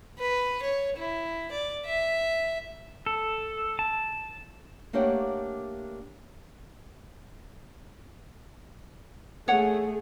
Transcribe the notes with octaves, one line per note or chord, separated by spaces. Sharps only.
B4
C#5
E4
D5
E5
A4
A5
A3 A#3 D4 G4 C#5 F#5
A3 G#4 C#5 F#5